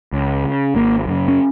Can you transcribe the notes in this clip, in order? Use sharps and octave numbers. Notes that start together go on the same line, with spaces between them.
C#2
C#3
G#1 A#3
F#2 C#3
C#4